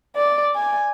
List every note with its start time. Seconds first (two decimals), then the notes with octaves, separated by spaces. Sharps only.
0.16 D5
0.56 G#5